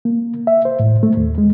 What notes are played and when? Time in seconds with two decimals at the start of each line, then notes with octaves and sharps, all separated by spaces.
0.05 A#3
0.47 E5
0.65 C5
0.80 A2
1.03 A3
1.17 D#2
1.38 G#3